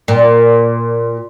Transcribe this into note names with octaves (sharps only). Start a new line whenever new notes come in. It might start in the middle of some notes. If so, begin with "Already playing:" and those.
A#2